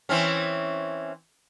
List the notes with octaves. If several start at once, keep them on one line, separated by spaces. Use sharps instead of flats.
E3 C4 C#4